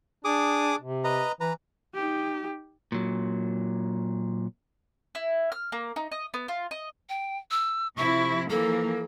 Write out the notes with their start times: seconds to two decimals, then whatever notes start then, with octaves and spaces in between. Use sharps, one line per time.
0.25 D4 G#4 D6 D#6
0.81 C3
1.04 B4 D#5 A#5
1.41 E3 B4 A#5
1.94 D#4 G4
2.92 A#2 F#3
5.15 E4
5.52 F6
5.72 A#3
5.96 D#4
6.12 D#5
6.34 B3
6.48 F4
6.71 D#5
7.09 G5
7.51 E6
7.97 C3 F3 E4 C#6
8.50 E3 F3 A#3 A4